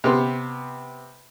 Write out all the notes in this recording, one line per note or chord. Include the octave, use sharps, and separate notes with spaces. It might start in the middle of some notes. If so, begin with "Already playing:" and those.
C3 B3 C6